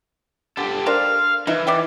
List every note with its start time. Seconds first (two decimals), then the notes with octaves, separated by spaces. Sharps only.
0.57 D3 G4 A4
0.86 D4 A#4 C5 F5
1.47 E3 D#4 E5
1.67 D5 E5 G5